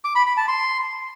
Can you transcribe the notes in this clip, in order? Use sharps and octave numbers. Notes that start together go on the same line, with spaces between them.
D6
B5
B5
A5
C6